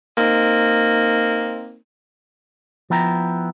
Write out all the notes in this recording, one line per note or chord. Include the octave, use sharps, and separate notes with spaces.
A#3 C4 D#4
F3 B3 E4 G5 A#5